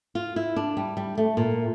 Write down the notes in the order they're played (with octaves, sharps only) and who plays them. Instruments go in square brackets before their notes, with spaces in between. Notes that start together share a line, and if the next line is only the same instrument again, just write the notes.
[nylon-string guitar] F4
E4
D4
G3
G3
A3
A#2